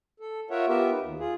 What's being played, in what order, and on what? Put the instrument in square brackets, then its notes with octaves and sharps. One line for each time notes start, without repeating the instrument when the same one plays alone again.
[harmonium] A4
F4 A#4 C#5 E5 F#5
B3 F4 G4 A#4 E5
D#4 B4
D#2
F4 G#4